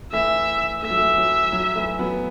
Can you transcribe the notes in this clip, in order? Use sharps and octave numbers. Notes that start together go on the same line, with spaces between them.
E3 A3 E5
A3 E5
F#3
E3 A3
F#3
F#3
E3 A3
F#3 B3